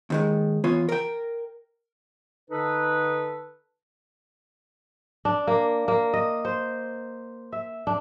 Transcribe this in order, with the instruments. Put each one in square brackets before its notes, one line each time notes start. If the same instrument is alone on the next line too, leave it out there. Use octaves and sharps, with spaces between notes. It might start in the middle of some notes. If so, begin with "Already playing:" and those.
[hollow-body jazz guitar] D#2 D#3 G#3
E3 B3 F4 C#5
A#4 G5
[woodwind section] D3 D#4 A4 B4
[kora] D4
A#3
A#3
D#5
C5
E5
D4